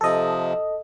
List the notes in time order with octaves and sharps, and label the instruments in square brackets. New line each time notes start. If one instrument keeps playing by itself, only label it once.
[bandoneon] C3 F3 [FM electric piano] A4 D#5